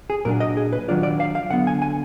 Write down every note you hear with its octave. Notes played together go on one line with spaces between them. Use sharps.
G#4
A#2 F#3 D4 A#4
D#5
G#4
B4
D#3 F#3 D4 F4 D5
D5
F5
F5
D3 F#3 B3 F#5
G#5
G#5